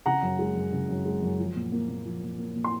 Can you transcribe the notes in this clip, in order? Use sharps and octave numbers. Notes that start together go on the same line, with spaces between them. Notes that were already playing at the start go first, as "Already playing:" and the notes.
C#3 F#5 A#5
F#2
G#3
F#2
C#3
F#2
G#3
F#2
F3
A#2
A#3
A#2
F3
A#2
A#3
A#2
C6